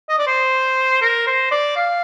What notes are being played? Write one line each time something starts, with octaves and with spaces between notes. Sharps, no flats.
D#5
D5
C5
A#4
C5
D5
F5